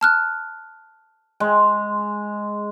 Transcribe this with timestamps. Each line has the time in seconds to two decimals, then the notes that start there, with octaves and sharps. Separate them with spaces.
0.01 A5 F6 F#6
1.40 G#3